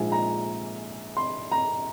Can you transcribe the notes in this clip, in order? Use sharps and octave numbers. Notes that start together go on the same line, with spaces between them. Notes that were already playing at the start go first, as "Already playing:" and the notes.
Already playing: A#1 G#2 F3 G#3 G#5
A#5
C6
A#5